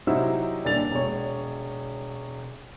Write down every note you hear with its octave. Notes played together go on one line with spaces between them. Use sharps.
C3 F#3 C4 D#4 E4 E6
D#1 D4 A4 A6 F7
E1 C#5